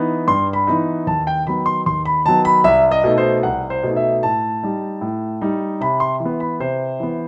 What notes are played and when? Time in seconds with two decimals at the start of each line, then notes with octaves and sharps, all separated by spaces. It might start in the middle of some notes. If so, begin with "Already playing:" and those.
Already playing: E3 B3 D#4
0.28 G2 C6
0.53 B5
0.67 E3 B3 D#4
1.07 D#2 A5
1.27 G5
1.46 D#3 F#3 B3 B5
1.66 C6
1.86 D#2 C6
2.05 B5
2.26 D#3 F#3 B3 A5
2.45 B5
2.64 C2 E5
2.91 D#5
3.04 B2 A3 D#4
3.18 C5
3.43 C2 F#5
3.70 C5
3.83 B2 A3 D#4
3.96 E5
4.23 A2 A5
4.63 G3 D#4
5.01 A2
5.41 G3 D#4
5.81 C3 B5
6.00 C6
6.20 E3
6.25 B3
6.40 B5
6.60 C3 C5
7.00 E3 B3